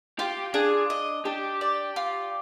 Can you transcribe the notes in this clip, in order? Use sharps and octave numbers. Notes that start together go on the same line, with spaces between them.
F4 G4
D4 G#4
D#5
D4 G4
D5
F4